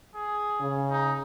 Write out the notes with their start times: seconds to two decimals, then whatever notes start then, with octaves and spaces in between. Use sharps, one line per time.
0.15 G#4
0.61 C#3
0.90 D#4